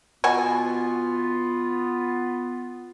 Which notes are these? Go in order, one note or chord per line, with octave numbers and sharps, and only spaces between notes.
B2 B3 F4 F#4 G#5